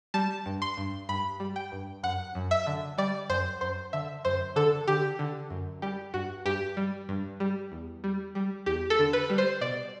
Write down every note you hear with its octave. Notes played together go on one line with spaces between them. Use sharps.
G3 A5
G2
C6
G2
G2 B5
G3
G5
G2
F#2 F#5
F#2
E5
D3
G3 D5
F#2 C5
F#2 C5
D3 E5
F#2 C5
D3 A4
D3 G4
D3
F#2
G3 G4
G2 F#4
G2 G4
G3
G2
G3
E2
G3
G3
E2 G4
A4
D3
B4
G3
C5
B2 D5